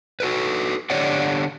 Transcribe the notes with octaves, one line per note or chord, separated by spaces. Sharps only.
F#4 A4 B4
D3 G4 C#5 D5 F#5